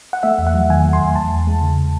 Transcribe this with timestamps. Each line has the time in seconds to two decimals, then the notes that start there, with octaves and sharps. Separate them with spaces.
0.13 F#5
0.23 A3 E5
0.38 E2
0.47 F#5
0.54 F#3
0.70 D#3 G#5
0.85 A3
0.93 C6
1.00 E2
1.16 E2 A5
1.32 E2
1.47 G#3
1.62 C#3